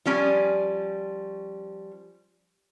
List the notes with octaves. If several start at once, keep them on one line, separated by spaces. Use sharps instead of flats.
F3 G3 C#4 G#5